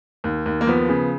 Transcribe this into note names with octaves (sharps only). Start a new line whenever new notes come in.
D#2
D#2
A#3
F3 B3
C#3